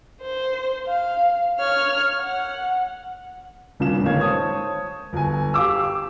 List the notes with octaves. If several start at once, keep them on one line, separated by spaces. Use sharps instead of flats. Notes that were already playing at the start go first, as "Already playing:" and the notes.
C5
F5
C#5 F6
F#5
D#1 G2 C#3 D4 E7
G1 G#2 D#3 C#5 F5 G#6
C5 C#5 A5 D#6 G#6
G1 G#5
G4 F5 D6 E6
D6